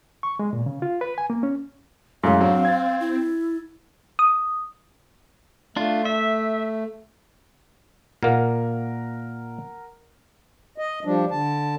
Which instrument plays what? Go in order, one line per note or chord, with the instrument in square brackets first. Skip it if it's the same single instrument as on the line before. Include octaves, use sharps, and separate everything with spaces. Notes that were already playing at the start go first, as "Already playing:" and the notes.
[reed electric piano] C#6
G#3
A#2
C#3
F4
B4
G#5
A#3
C#4
[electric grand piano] F#2 A2 C#3 [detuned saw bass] G#3 [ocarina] F5
[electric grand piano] F#3 D4 [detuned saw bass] C4
[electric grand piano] G#6 A6
[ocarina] E4
[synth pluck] D#6
[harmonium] A3 [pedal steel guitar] D4 F4
[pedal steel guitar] E5
[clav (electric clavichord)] A#2 A#3 [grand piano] A#4 F#5
[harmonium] D#5
F3 G3 D4
D3 A5